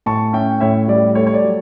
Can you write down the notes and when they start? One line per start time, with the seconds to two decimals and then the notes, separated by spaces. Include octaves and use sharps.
0.06 A2 A5 C#6
0.33 C#4 E5 G5
0.60 A2 C#5 E5
0.88 G3 D5
1.15 A3 C#5
1.27 C#5
1.34 D5
1.43 F#3